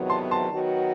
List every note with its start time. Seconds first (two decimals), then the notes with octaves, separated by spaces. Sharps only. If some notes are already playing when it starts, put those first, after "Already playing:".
Already playing: E2 C3 D#3 F#3 B3
0.10 A5 C6
0.31 A5 C6
0.52 D#3 F#3 B3 F#4